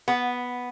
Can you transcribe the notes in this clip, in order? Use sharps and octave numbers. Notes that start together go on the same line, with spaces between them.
B3